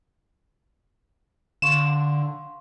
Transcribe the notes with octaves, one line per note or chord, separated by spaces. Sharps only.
D3 F5 C6 C#6 E7